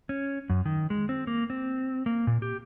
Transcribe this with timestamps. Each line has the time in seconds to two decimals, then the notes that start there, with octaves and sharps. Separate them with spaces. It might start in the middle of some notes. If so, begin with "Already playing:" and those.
0.09 C#4
0.50 F#2
0.66 D#3
0.90 G#3
1.09 C4
1.27 A#3
1.50 C4
2.06 A#3
2.27 A#2
2.42 G4